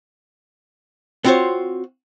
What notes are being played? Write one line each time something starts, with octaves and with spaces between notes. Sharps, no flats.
B3 C4 F4 F#4 C5 C#5